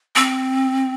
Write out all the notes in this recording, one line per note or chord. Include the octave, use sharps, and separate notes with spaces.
C4